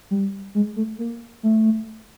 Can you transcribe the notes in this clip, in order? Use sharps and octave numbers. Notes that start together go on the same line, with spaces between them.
G3
G#3
A3
A#3
A3